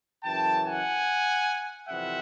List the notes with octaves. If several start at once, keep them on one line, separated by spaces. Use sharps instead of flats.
F#2 C#3 E3 G5 A5
F#5 G#5
F2 C3 E3 G3 C4 E5 F#5